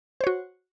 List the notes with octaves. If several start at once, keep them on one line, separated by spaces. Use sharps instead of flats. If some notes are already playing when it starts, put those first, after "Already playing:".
F#4 C5 C#5